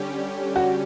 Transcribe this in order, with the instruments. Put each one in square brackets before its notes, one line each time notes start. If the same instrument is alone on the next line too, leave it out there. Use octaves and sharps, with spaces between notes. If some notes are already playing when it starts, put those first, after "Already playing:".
Already playing: [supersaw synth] D3 G3 C#4 G4
[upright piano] F#4